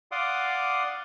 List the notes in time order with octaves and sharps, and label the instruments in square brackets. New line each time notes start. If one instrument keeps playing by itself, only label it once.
[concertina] D5 F5 F#5 C6 D6 D#6